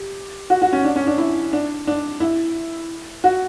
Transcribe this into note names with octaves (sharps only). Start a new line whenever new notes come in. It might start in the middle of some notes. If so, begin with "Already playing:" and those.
Already playing: G4
F#4
F#4
C#4
D4
C#4
D4
E4
D4
D4
E4
F#4